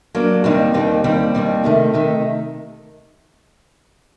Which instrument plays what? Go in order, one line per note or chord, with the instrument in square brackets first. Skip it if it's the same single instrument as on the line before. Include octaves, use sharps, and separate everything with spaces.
[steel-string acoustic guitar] F#3 A#3 D4
D#2 D#3 G3 C4
D#2 D#3 G3 C4
D#2 D#3 G3 C4
D#2 D#3 G3 C4
C3 D#3 A3
C3 D#3 A3